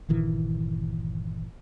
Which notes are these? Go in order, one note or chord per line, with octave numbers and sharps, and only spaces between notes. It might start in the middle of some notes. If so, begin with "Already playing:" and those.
G1 A#2 D#3 E3